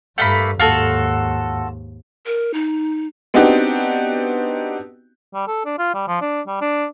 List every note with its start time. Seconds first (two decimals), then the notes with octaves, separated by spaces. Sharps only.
0.18 G2 A3 A#3 B5
0.59 D#2 G#2 F4 F#4 A4
2.26 A#4
2.54 D#4
3.34 B3 C4 D4 D#4 F#4 G4
5.34 G3
5.48 A4
5.65 D4
5.78 F4
5.94 G3
6.08 F3
6.21 D4
6.47 G3
6.61 D4